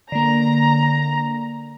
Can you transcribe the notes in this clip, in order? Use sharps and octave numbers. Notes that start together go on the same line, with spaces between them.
D3 A#3 A#5